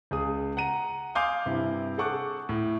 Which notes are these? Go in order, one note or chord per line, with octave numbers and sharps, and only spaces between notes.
C#2 G#4 D#6
F#5 A#5 D#7
F5 G#5 C6 D6 D#6 G6
G2 C3 E4
G#4 A4 F#5 C#6 D6 F#6
A2